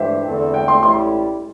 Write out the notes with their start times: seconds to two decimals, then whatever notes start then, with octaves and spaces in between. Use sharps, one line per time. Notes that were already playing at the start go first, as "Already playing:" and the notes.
Already playing: G2 E3 G3 D4 G4 C5 E5
0.25 E2 D3 A3 C4 A4
0.54 G5
0.68 C6
0.82 A1 A2 G3 E4 C6